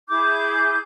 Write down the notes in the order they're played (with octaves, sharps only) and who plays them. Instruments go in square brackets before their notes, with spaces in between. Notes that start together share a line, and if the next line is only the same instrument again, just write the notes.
[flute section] E4 G#4 D6 G6